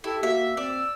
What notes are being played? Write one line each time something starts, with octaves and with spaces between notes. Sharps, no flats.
E4 G4 A4
A#3 F#4 E5
C4 D5 E6